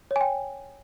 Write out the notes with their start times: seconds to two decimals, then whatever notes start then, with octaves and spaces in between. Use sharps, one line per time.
0.11 C#5
0.16 G#5
0.21 G5